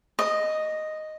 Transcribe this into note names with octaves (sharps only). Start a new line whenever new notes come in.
D#5